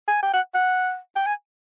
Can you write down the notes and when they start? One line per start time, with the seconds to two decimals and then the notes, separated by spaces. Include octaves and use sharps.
0.08 G#5
0.23 G5
0.33 F#5
0.55 F#5
1.16 G5
1.26 G#5